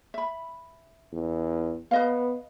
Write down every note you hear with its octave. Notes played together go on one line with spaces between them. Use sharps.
E5 B5
E2
B3 B4 D#5 F5